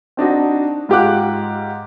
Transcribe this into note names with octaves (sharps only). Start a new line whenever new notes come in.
C4 D4 D#4 F#4
G#2 F4 G4 F#5 D6 F#6